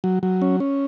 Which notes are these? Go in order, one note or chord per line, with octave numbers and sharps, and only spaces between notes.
F#3
F#3
C#4
C#4